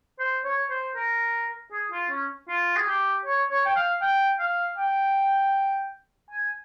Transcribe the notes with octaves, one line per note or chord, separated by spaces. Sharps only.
C5
C#5
C5
A#4
G#4
F4
C#4
F4
G#4
G4
C#5
C#5
G5
F5
G5
F5
G5
G#5